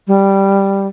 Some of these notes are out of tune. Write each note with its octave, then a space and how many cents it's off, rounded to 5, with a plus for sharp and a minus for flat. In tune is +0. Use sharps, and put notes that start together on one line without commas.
G3 +0